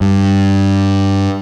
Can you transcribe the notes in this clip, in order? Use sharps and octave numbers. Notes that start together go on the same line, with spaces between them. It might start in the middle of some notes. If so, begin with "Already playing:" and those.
G2